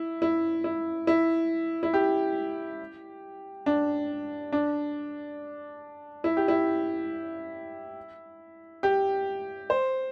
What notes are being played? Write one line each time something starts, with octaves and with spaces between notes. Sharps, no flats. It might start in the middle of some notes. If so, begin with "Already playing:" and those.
Already playing: E4
E4
E4
E4
E4
G4
D4
D4
E4
G4
E4
G4
C5